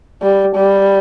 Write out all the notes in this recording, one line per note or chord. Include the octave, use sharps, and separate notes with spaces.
G3
G3